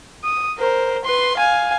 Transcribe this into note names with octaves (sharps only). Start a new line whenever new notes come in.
D#6
A#4 C5
B4 C6
F5 G#5